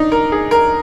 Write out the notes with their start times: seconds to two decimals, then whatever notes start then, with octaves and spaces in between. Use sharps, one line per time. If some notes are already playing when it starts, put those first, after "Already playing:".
Already playing: D4 D#4
0.12 A#4
0.32 G#4
0.51 A#4